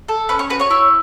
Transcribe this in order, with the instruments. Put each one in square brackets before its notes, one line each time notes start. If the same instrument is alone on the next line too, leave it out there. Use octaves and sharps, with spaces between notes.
[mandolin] A4
C#4 B4 B5
C#5 C#6
F#4 B4 B5
C#5 C#6
E4